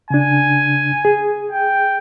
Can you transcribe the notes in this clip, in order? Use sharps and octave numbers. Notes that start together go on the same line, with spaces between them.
C#3 D4 G#5
G#4
G5